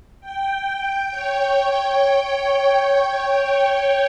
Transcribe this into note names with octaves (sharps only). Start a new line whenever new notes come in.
G5
C#5